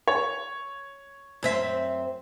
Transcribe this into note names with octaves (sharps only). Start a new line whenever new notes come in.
C#5
F#2 C4 E5